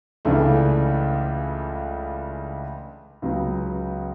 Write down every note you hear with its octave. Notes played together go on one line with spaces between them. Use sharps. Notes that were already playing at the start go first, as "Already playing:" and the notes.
C#2 C#3 E3 A3 D4
C#2 C#3 F#3 B3